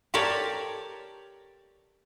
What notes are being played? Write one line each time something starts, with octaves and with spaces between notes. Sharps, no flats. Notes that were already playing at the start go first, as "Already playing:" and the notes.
G4 A4 A#4 C#5 D5